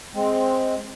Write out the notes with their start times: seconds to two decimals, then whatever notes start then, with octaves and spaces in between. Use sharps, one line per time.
0.15 G#3 C4